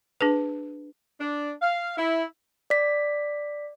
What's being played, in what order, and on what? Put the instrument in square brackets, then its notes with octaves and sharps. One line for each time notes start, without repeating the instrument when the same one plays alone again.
[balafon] D4 G#4 B4
[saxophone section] D4
F5
E4
[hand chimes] D5 B6